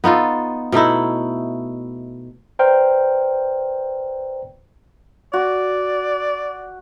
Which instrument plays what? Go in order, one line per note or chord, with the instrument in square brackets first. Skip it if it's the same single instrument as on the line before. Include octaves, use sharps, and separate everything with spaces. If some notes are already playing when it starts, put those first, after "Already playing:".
[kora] B3 D#4 F4 A4
B2 A3 D#4 E4
[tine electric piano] B4 C5 D5 G5 A#5 F6
[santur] F#4 [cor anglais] D5